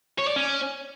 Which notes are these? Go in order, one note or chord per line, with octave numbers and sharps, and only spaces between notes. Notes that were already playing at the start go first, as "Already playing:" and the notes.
C#5
D5
C#4